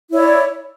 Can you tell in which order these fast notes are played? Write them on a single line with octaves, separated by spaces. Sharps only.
E4 C#5 D5